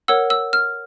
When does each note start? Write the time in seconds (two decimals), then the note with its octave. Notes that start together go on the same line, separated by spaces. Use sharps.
0.08 A#4 C#5 F#5 E6
0.30 E6
0.53 F6